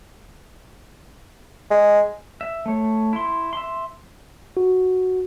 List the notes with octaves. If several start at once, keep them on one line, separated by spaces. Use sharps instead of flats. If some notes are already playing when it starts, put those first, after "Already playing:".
G#3
E5
A3 C#5
E4 C6
E5 C6
F#4